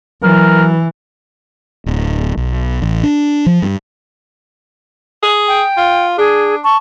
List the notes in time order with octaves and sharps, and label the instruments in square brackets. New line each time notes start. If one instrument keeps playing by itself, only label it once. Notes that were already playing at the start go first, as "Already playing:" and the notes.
[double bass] E3 [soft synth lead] F#3 [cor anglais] A#4
[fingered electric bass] D1
B1
A1
D4
F3
G2
[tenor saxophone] G#4
[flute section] G5
[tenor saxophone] F4
[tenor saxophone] D4 [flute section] G#4
[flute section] A5 C#6